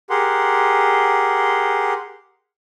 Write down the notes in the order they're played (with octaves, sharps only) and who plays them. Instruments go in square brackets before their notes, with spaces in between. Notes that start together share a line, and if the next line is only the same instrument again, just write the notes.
[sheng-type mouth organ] G4 G#4 A#4 F#5 C6